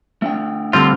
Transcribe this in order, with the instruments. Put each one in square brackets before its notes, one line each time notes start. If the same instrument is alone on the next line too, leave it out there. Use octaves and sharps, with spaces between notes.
[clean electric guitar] A3 D4 G5
[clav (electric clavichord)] D3 G3 C4 [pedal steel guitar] F4